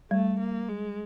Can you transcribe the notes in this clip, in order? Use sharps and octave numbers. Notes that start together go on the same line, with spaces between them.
G3 A3
A#3
G#3